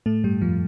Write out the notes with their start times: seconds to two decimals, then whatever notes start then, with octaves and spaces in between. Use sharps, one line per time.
0.06 A2 A3
0.24 G2 G3
0.42 F2 F3